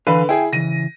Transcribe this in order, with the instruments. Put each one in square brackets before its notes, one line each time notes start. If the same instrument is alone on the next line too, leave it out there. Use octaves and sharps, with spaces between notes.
[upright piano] D3 B4 B5 [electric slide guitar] E3 F5 G#5
[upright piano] E4 G#4 [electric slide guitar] G5
[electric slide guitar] C#3 E3 [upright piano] A#6 D#7